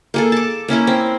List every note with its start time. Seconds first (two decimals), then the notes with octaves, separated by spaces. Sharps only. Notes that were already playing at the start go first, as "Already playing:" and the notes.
0.14 A#3 G#4 A4
0.32 A5 D6
0.68 A#3 C#4 E4 A#4
0.87 C4